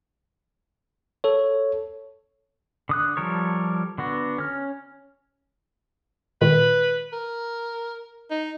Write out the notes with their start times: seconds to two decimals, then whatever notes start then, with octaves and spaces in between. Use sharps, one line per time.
1.24 A4 C#5
2.89 D3 D#6 F#6
3.17 F3 G3 A4 A#4 C#5
3.98 D3 B3 F#4
4.38 C#4 F6
6.41 A#2 D#3 G#3 B4
7.13 A#4
8.31 D#4